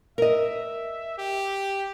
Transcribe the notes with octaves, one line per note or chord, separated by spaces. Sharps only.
A#4 D#5 E5
G4